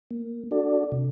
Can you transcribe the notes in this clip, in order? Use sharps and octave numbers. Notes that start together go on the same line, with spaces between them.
A#3
D4 F#4 A4 D5
C3